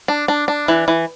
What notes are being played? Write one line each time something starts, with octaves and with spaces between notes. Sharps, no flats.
D4
D4
D4
E3
E3